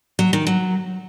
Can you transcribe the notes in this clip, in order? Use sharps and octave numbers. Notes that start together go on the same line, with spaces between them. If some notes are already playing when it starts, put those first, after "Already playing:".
F#3
D#3
F#3